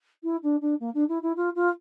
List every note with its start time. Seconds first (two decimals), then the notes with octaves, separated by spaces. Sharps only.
0.23 E4
0.42 D4
0.61 D4
0.80 A#3
0.94 D4
1.08 E4
1.22 E4
1.36 F4
1.55 F4